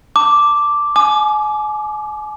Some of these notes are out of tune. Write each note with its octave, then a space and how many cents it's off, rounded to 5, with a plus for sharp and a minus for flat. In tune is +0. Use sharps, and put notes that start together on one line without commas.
A5 +25 D6 +0
G#5 +35 D6 +30